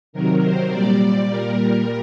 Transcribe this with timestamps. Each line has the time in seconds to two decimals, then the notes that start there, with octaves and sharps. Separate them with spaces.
0.13 C3 D#3 F#3 A#4
0.43 C5
0.71 A#2 G3 D5
1.01 D5
1.30 A#2 G3 A#4